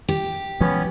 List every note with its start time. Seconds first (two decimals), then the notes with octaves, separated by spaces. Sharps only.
0.09 G4
0.60 E3 F#3 G#3 B3 C#4